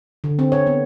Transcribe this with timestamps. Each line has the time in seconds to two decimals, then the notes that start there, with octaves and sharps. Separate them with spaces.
0.24 D3
0.39 C4
0.52 C#5
0.66 B3